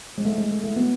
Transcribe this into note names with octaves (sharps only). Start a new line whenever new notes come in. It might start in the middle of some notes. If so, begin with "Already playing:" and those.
G#3
A3
G#3
A3
A3
B3